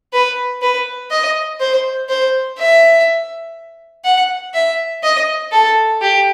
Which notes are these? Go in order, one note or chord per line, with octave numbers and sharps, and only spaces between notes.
B4
B4
D#5
C5
C5
E5
F#5
E5
D#5
A4
G4